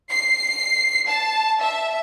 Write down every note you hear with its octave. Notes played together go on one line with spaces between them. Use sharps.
C7
A5
E5